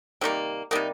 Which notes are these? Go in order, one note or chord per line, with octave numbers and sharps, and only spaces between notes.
C3 D#3 G3 A#3 C4
C3 G3 A#3 D#4